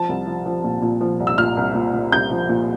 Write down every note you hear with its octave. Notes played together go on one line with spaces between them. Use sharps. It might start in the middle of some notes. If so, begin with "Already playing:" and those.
Already playing: F3 A5
C2
F3
F3
A#2
A#2
F3
C2
E6
A#2 F6
C2
A#2
A#2
C2 G6
F3
A#2